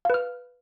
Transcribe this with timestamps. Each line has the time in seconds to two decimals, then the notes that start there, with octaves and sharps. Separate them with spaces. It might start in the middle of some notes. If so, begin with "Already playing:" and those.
0.05 F5
0.10 B4
0.14 F6